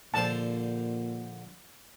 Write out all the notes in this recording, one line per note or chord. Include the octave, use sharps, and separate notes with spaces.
A#1 A#2 D3 C5 A5